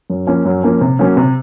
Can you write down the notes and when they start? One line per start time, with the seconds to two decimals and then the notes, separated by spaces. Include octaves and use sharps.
0.10 F#2
0.27 F3 A#3 C#4
0.45 F#2
0.63 F3 A#3 C#4
0.81 C3
0.99 F#3 A#3 C#4
1.17 C3